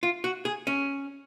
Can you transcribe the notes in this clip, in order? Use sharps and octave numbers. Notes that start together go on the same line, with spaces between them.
F4
F#4
G#4
C#4